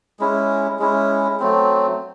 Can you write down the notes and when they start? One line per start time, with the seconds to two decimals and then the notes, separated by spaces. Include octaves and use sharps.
0.19 G#3 C#4 E4
0.79 G#3 C#4 E4
1.40 F#3 A3 C4